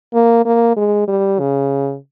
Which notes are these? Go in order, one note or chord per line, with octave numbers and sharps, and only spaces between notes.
A#3
A#3
G#3
G3
C#3